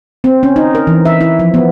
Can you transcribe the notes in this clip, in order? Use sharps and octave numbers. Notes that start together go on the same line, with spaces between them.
C4
C#4
D#4
A#4
E3
E5
E4
F3
B3